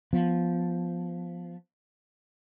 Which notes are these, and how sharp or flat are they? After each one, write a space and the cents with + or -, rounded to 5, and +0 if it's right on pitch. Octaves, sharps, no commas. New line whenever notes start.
F3 +0 B3 +0